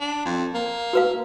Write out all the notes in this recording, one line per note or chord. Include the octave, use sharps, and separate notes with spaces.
D4
F2
A#3
F#4 B4 F5